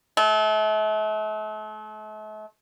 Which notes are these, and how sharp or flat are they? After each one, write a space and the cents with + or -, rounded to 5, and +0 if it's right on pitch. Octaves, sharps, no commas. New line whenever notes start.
A3 -40